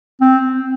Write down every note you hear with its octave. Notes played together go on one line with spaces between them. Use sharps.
C4